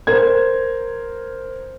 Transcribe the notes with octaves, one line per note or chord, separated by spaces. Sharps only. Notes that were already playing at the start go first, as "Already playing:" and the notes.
A#4 C5 G#6